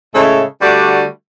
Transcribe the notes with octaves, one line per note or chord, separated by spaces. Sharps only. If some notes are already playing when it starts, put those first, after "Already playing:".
A2 C#3 G#3 A4 C#5 E5
D3 G3 A3 D4 F#4